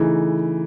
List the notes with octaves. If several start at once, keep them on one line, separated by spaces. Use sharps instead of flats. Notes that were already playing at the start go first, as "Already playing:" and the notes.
Already playing: C#3 E3 A3 D#4